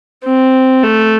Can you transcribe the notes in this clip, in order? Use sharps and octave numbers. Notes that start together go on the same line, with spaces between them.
C4
A3